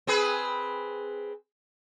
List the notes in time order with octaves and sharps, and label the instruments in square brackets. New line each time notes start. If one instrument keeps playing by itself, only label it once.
[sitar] C4 G#4 B4